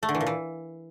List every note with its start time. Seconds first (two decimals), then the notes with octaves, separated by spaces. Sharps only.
0.03 A3
0.09 D3
0.15 E3
0.21 A#2
0.27 E3